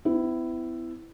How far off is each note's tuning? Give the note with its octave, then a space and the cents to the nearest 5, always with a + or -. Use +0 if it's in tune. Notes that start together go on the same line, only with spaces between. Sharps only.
B3 +45 E4 +5